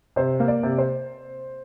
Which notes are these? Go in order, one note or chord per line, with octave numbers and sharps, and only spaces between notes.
C3 C5
A#3
D5
C3
C5